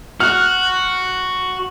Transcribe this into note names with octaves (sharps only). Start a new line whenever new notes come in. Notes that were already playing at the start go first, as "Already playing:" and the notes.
F#4 F6 F#6